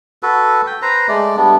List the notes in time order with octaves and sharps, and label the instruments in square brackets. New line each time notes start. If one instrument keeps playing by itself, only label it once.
[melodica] F#4 A4 B4
G5
B4 C5 A#5
G#3 A3 D5
G3 A3 B3 D4